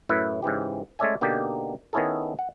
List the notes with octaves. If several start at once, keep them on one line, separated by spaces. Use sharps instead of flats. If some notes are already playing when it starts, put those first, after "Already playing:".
F#2 A2 E4 B4 E5
G#2 C#3 E3 G4
G#3 A3 C#4 D5 E5 G#5
B2 D3 A#3 D#4 G4
D#3 B3 C#4 E4 G#4 A4
F#5